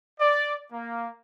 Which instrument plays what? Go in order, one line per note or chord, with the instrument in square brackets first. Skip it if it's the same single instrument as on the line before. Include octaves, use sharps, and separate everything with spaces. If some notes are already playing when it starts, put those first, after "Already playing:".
[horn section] D5
A#3